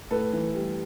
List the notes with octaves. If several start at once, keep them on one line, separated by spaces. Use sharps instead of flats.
A2 A4 B4
E3
G3